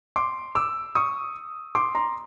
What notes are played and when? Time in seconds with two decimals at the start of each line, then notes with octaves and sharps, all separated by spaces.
0.16 C6 D6
0.55 D6 E6
0.95 C#6 D#6
1.75 C6 D6
1.95 A#5 C6